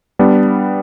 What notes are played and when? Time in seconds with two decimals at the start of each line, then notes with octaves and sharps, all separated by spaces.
0.19 G3 B3 D4